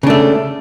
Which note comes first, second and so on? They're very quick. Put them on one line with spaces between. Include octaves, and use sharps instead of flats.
C#3 D4 A3